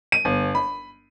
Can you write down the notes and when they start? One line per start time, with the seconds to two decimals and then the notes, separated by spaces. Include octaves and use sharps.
0.12 D#7
0.25 G1
0.55 B5